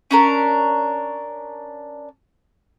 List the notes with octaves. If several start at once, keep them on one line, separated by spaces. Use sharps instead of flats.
C#4 D4 A#4